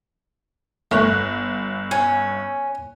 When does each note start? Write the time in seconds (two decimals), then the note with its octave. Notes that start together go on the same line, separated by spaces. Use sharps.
0.91 G1 A3 C#5 F#6
1.91 C#4